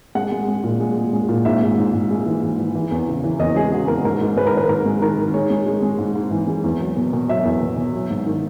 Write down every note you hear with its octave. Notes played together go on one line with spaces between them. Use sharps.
G#3 F#5
G#3
G#3
A#2
G#3
G#3
G#3
A#2
G#2 E5
G#3
G#2
G#2
G#3
E3
G#2
E3
E3
E2
C#3
E3
E2 D#5
G#3 G#4
C#3 F#4
E2 A#4
G#2 A#4
G#2
G#3 B4
A#4
D#3 B4
G#2 A#4
G#3
D#3 A#4
D#3
G#3 C#5
G#3
G#3
G#3
G#2
G#2
E3
G#3
E2
F#3
B2
B2
F#3 E5
E2
B2
B2
F#3
G#2
D#3